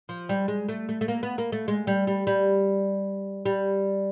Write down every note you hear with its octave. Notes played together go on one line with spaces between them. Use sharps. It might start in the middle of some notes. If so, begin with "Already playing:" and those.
F3
G3
G#3
A3
A3
A3
A#3
B3
A#3
A3
G#3
G3
G3
G3
G3